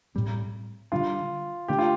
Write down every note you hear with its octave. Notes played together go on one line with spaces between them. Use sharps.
A2 G3 C4
D3 G3 D4 F4
D3 A3 D4 G4
F4